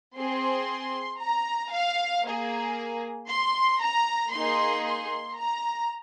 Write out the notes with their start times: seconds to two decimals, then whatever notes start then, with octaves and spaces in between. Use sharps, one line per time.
0.17 C4 G#4 C6
1.21 A#5
1.73 F5
2.25 A#3 G#4
3.29 C6
3.80 A#5
4.33 A#3 D#4 G#4 C6
4.85 C6
5.36 A#5